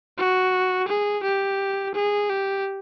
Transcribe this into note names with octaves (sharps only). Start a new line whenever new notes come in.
F#4
G#4
G4
G#4
G4